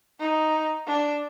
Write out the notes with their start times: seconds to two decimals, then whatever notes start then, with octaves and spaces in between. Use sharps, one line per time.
0.20 D#4
0.87 D4